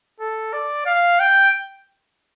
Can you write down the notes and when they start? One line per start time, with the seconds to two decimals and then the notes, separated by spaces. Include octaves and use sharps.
0.21 A4
0.53 D5
0.86 F5
1.20 G5